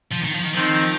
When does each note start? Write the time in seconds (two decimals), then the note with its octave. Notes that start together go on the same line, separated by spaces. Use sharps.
0.12 F3
0.23 D#3
0.33 F3
0.44 D#3
0.55 D#3 F3 C4 D#4